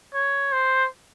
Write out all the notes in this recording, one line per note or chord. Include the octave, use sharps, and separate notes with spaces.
C#5
C5